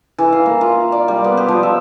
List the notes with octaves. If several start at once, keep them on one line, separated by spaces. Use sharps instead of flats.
E3
F5
A#3
F4
D5
G3
B3
G4
F3
E5